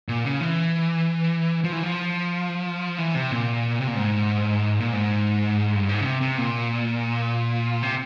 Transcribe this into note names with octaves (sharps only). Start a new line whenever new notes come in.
A#2
C#3
E3
F3
E3
F3
E3
C3
A#2
C3
A#2
G#2
A#2
G#2
G2
G#2
C#3
C3
C3
A#2
C3